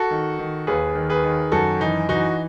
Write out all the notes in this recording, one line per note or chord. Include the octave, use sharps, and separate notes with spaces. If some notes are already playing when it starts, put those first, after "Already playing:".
Already playing: F#4 A4
D#3
D#3
D#2 G#4 B4
D#3
G#4 B4
D#3
F#2 F#4 A4
E3 D#4
E3 D#4 F#4